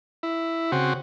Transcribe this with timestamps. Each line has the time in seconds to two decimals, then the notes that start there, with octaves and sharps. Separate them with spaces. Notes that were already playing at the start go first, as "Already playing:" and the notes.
0.23 E4
0.72 C#3 C4 F#4